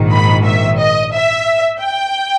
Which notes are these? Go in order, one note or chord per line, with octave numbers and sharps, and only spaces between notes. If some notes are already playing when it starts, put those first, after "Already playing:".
Already playing: A#1 G#2 D#3
B5
E5
D#5
E5
G5